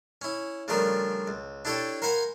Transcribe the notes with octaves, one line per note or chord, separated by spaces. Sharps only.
C#4 E4
C#3 F3 G3 A3 D4 A#4
C#2
D4 E4 G4 A4 C#5 G5
A#4 C5 F5 F#5 G#5 B5